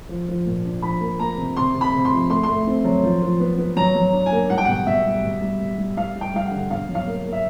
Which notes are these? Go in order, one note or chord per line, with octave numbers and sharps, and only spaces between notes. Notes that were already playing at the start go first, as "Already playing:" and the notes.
F3
F3
A#2
D4
F3 B5
A#3
A#3 A#5
C3
C3 C6
C3
B5
C3
C6
F3
A3 C6
A3 C6
C4
F#3
F3
F3
B3
B3
F#3 A#5
F#3
D4
G#5
A#3
G3 F#5
G5
B2 F#5
B2 E5
G3
B2
G3
B2
G3
G3 F5
G3
G5
G3 F5
F#5
D3
B2 F5
F#3
F5
A#3
A#3
E5